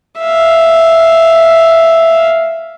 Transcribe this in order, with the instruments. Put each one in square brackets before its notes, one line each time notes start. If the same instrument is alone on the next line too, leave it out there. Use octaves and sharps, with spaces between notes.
[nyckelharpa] E5 F5